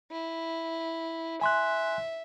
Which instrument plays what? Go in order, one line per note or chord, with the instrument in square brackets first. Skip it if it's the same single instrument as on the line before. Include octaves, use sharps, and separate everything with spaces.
[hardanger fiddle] E4
[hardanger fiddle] E5 [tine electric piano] G#5 C6 F#6